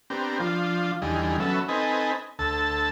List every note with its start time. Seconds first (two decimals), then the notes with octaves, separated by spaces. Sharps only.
0.10 B3 C4 D4 G4 A#4
0.40 F3 D4 F4
1.02 E2 D3 G3 D#4 G#4
1.40 F#3 B3 C#4 A4 E5
1.69 C4 D#4 A4 B4 D#5 G#5
2.39 D2 A4 A5 E6